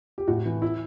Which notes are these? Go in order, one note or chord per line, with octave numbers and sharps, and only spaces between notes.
G4
A2 F#4
E3
E4